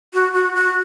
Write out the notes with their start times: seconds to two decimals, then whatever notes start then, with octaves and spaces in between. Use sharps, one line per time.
0.14 F#4
0.34 F#4
0.55 F#4